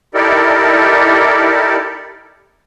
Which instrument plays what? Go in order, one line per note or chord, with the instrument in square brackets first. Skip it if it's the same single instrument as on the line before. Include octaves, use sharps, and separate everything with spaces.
[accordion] D#4 E4 G4 A4 A#4 D5